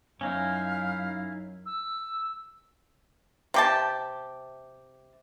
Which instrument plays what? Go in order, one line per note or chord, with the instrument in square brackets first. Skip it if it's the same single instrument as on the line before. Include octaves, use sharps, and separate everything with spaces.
[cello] F#2 [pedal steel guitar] C#4 D#4 E4 [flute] F5
[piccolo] E6
[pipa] C3 G4 A5